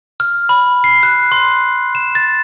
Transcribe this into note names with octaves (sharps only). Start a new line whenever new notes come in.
F6
B5
C7
F#6
C6
E7
A6